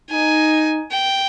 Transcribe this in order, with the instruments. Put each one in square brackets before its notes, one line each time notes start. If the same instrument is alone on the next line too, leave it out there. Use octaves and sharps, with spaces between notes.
[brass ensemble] D#4 [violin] G#5
[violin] G5